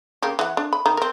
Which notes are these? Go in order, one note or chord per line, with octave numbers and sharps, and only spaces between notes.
C#3 A#3 G4
E3 F#5
D4
B5
D#3 A#5
C4 A#4